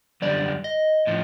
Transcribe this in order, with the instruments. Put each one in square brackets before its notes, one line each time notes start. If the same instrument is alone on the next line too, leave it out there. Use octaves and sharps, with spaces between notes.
[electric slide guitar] F#2 D3 G3 [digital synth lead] D5
[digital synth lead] D#5
[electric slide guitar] A2 F3